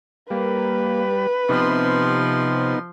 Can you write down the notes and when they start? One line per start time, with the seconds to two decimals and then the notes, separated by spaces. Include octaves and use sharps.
0.30 G3 A#3 B4
1.49 C3 F3 B3 D#4 C6